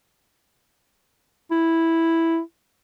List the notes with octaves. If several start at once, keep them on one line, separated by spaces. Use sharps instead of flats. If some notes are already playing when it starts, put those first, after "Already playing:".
E4